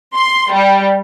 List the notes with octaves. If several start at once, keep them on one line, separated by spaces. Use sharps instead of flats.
C6
G3